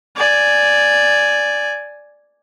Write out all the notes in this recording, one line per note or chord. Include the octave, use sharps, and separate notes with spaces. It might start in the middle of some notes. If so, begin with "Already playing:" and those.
D5 G#5